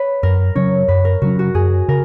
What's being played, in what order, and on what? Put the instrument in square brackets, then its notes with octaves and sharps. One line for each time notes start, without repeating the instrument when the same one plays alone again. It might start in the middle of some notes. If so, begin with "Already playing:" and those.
Already playing: [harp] B4 C#5
[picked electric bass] F#2 [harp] A#4
[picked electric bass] C#3 F#3 C#4 [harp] C#5
[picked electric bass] F#2 [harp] B4
[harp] A#4
[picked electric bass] C#3 F#3 C#4 [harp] F#4
[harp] F#4
[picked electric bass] F#2 [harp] G#4
[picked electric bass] C#3 [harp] A#4